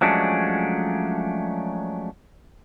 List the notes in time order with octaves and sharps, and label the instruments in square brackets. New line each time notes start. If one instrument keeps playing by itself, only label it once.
[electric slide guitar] F3 F#3 G#3 A3 C#4 D4